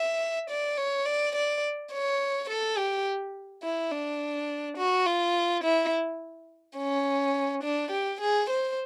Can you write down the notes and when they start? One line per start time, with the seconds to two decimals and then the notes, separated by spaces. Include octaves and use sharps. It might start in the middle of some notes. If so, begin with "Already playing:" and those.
Already playing: E5
0.50 D5
0.78 C#5
1.06 D5
1.36 D5
1.93 C#5
2.49 A4
2.78 G4
3.64 E4
3.92 D4
4.77 F#4
5.06 F4
5.64 E4
6.78 C#4
7.64 D4
7.92 G4
8.21 G#4
8.50 C5